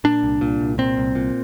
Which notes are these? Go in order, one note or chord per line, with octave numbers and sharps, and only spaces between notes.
A#2 D4
C2
A#2
C2
A#2 C4
C2
A#2